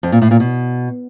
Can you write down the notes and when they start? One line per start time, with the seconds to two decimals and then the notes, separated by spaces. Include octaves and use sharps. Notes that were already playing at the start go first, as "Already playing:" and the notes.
0.03 F2
0.12 A#2
0.22 A2
0.31 A#2
0.40 B2